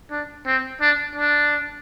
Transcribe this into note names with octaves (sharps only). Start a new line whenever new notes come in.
D4
C4
D4
D4